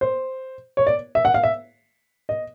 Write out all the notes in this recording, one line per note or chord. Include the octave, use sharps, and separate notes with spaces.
C5
C#5
D5
E5
F#5
F5
E5
D#5